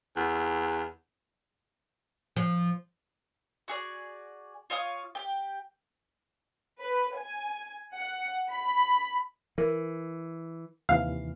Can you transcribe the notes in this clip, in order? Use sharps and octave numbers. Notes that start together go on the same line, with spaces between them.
E2
F3
F#4 G#4 D5
F4 C#5 F5 D#6
G4 G5
B4
G#5
F#5
B5
E3 A#4
D#2 C3 E3 F5